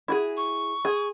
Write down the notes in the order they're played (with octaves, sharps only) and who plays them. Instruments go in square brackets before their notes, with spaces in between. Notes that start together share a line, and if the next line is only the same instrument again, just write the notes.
[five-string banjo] E4 F#4 G#4
[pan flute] C#6
[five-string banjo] G#4